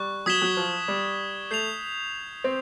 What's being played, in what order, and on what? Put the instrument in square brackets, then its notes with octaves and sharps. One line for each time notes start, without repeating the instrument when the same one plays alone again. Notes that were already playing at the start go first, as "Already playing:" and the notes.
Already playing: [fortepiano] G3 [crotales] C#6 F#6
[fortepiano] F#3 [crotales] D#6 G#6 B6 E7 G7
[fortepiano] F#3
F3
G3
[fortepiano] A3 [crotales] G6 C7 F7
[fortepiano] C4